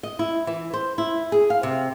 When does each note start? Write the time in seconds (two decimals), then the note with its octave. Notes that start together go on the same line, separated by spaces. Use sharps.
0.03 D#5
0.19 E4
0.47 E3
0.74 C5
0.98 E4
1.32 G#4
1.50 F5
1.63 C3